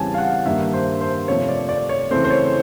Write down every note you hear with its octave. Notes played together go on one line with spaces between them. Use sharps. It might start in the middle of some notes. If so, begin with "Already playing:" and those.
Already playing: E2 C#3 E3 G3 C4 G#5 A5
F5
F#5
G2 D#3 G3 A#3 E5
C5
C5
C3 F3 A3 C4 C#5
D5
D5
C#5
C#3 E3 A3 C4 C5
C5
C#5